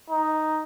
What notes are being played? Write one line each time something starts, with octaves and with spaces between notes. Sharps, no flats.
D#4